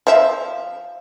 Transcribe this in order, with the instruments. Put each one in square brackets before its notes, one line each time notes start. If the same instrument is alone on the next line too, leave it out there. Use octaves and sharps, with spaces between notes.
[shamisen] F3 E5